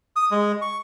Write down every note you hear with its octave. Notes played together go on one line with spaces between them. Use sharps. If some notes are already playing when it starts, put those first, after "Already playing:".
D#6
G#3
C#6